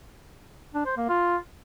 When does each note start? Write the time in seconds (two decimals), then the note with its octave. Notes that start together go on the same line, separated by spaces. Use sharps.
0.74 D4
0.86 C5
0.97 A#3
1.09 F4